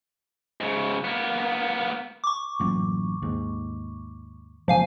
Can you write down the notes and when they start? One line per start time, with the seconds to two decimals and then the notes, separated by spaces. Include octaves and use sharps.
0.60 G#2 C#3
1.04 A#3 B3
2.24 C#6 D6
2.60 A1 F#2 A#2
3.22 D#2 G#2
4.68 F#1 C#2 A#2 F3 F5 G#5